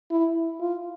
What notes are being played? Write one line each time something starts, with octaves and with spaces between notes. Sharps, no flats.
E4
F4